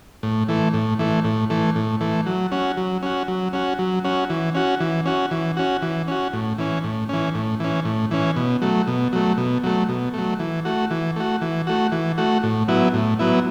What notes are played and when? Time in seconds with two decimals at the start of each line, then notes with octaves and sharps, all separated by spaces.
0.23 A2
0.48 E3 A3
0.74 A2
0.99 E3 A3
1.24 A2
1.50 E3 A3
1.76 A2
2.01 E3 A3
2.26 F#3
2.52 C#4 F#4
2.77 F#3
3.03 C#4 F#4
3.28 F#3
3.53 C#4 F#4
3.79 F#3
4.04 C#4 F#4
4.30 E3
4.55 C#4 F#4
4.80 E3
5.06 C#4 F#4
5.31 E3
5.57 C#4 F#4
5.82 E3
6.08 C#4 F#4
6.33 A2
6.58 E3 C#4
6.84 A2
7.09 E3 C#4
7.35 A2
7.60 E3 C#4
7.85 A2
8.11 E3 C#4
8.36 B2
8.62 F#3 A3
8.88 B2
9.13 F#3 A3
9.38 B2
9.64 F#3 A3
9.89 B2
10.14 F#3 A3
10.40 E3
10.65 A3 F#4
10.91 E3
11.16 A3 F#4
11.41 E3
11.67 A3 F#4
11.92 E3
12.18 A3 F#4
12.43 A2
12.68 F#3 B3 E4
12.94 A2
13.19 F#3 B3 E4